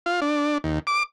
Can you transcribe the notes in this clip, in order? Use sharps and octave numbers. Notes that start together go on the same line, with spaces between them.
F4
D4
D#2
D6